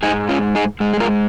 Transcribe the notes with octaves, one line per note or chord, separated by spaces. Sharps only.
G#3 D#4 G#4
G#2
C#4 F4
D#4 G#4
G#2 G#3
G#4
F4 A#4